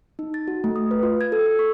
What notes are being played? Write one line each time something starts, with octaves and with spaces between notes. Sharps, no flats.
D#4
A6
F#4
A3
D#6
B4
F4
G#6
A4
E6
C#6